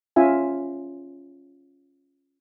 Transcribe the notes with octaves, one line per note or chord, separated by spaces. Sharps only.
C#4 F4 E5 G#5